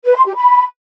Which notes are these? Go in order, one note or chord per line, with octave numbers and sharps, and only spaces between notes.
B4
C6
G4
B5